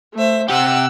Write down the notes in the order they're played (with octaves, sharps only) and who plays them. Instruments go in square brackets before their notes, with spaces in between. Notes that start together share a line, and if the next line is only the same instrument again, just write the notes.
[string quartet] A3 C5 E5
[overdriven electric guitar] C3 G4 [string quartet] F#5 E6 F#6